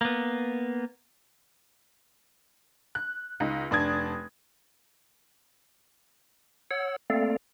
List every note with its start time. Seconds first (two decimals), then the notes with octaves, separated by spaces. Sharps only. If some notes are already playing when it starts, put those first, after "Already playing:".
0.01 A#3 B3
2.95 F#6
3.40 C#2 D#4
3.71 F1 D4 D#6 G#6
6.71 C#5 F#5 E6
7.10 A3 A#3 C4 A4 D5 F5